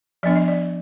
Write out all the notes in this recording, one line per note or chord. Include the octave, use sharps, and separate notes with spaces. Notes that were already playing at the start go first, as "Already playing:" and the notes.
F3 B3 D4 D5
D#5
D5